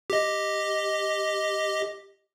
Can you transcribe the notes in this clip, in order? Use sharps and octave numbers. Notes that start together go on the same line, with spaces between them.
G4 D#5